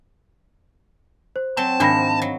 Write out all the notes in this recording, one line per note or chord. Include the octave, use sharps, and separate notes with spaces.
C5
F#3 C4 A5
G#2 D#3 F3 D4 B5 A#6
F#3